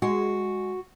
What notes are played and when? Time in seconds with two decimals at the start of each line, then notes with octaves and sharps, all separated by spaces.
0.02 G#3 F#4